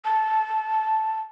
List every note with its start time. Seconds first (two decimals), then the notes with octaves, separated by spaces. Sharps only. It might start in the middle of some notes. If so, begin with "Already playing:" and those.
0.05 A5